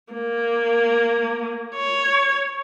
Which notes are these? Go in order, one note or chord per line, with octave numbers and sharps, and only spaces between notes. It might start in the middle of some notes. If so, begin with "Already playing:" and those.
A#3
C#5